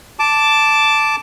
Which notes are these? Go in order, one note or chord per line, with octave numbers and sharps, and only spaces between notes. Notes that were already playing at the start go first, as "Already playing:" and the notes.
A5 D6